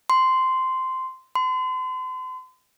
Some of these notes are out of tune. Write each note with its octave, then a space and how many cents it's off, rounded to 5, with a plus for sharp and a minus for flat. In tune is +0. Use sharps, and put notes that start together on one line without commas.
C6 -10
C6 -40